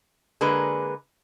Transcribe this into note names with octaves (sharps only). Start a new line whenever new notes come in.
D3 G#3 A#3 G#4 A#4 B4